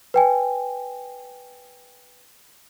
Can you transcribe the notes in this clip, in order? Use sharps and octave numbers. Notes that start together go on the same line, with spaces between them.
B4 G5 G#5